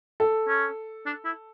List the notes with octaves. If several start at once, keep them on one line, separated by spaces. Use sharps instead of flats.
A4
C#4
D4
E4